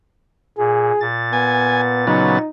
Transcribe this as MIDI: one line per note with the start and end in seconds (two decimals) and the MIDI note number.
0.58 0.91 46
0.58 1.04 68
1.01 2.38 46
1.01 2.38 93
1.33 2.05 59
1.33 1.82 80
2.07 2.39 49
2.07 2.39 54
2.07 2.39 59
2.07 2.50 63